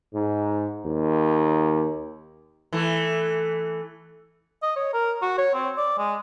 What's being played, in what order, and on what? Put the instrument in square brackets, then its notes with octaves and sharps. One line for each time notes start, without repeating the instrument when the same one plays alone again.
[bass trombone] G#2
D#2
[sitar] E3 A3
[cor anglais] D#5
C#5
A#4
F#4
C#5
C4
D5
G#3